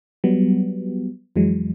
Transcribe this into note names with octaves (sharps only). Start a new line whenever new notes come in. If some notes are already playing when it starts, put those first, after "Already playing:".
F#3 G3 B3
F2 E3 F#3 G#3